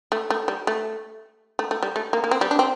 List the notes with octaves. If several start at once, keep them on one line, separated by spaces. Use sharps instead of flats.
A3
A3
G3
A3
A3
A3
G3
A3
A#3
A#3
C4
G3
D4
C4